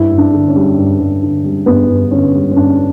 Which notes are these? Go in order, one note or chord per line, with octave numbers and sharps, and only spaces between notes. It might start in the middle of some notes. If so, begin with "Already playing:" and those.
Already playing: G2 E4
G2
D4
D3
C#4
G3
G2
G2
D3
G3
G2 B3
G2
D3 C#4
G3
C#4
G2 D4